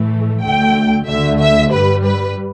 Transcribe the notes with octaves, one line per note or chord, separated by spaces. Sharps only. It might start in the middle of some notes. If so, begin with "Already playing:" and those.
Already playing: A2 E3 A3
D2 D3 A3 G5
D2 D3 A3 E5
E5
G2 G3 B4
B4